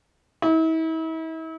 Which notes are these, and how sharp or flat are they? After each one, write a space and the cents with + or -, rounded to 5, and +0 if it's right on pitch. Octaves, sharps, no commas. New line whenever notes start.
E4 -40